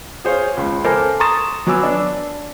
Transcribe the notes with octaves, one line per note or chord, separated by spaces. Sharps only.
G#4 C5 C#5 F5
C#2
A4 A#4 C5 G#5 D6
A#5 C6 C#6 D#6 A6 E7
F#3 B3 G#5 D6 E6
D4